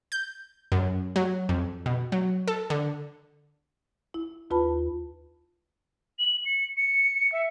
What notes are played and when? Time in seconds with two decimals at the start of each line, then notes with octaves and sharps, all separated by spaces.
0.12 G6
0.72 F#2
1.16 F#3
1.49 F2
1.86 B2
2.12 F#3
2.48 A4
2.70 D3
4.14 E4
4.50 D#2 F4 B4 A5 B5
6.19 F#7
6.45 C#7
6.77 C#7
7.32 E5